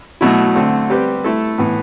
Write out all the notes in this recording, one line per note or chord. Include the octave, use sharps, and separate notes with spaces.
B2 F#3 A3 E4
D3 A3 C4
G3 C4 G4 B4
A3 E4 A4
A2 E3 B3